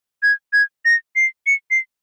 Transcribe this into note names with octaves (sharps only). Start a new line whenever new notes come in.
G#6
G#6
A#6
C7
C#7
C7